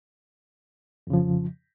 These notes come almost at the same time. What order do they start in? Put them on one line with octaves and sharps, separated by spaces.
F2 C#3 F3